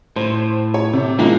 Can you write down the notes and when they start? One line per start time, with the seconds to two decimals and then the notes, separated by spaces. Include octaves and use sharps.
0.16 A2 C5
0.74 C#5
0.93 C3
1.19 A2 F3 G#3 A#3